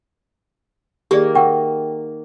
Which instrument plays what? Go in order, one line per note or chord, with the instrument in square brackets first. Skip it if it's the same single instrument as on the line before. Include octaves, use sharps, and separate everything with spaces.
[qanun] D#3 A#3 [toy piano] G4 G#4 D5
[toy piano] A#4 F#5 C#6 [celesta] G5